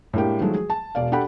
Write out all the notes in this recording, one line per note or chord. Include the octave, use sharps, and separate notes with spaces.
A2 G#3 A#3 D4 G4
D#3 F3 F#3 G#3 A3
G#4
A5
E1 B2 D5 F5
D4 G4 A4 F#5 B5